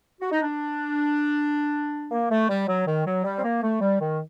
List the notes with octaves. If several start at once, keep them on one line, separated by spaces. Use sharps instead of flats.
F#4
D#4
D4
A#3
A3
G3
F#3
D#3
F#3
G3
C4
A#3
A3
G3
D#3